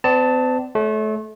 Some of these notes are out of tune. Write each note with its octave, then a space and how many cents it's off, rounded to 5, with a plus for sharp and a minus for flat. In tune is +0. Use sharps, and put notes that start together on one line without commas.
C4 -45 D5 +0 A5 +5
A3 -30 C#5 +25